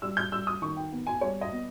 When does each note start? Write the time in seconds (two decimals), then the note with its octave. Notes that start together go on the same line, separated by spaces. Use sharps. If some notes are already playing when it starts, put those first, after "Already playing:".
0.02 G3 E6
0.17 G6
0.32 G3 E6
0.47 D#6
0.62 D#3 C#6
0.77 G5
0.92 B3
1.07 G#5
1.21 G3 C#5
1.41 D#5
1.52 B3